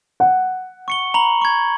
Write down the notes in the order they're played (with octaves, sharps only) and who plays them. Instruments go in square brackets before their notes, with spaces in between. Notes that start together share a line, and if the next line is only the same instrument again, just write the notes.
[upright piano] F#5
[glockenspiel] C#6 C#7 G7
A#5 B5 F#7
C#6 G#6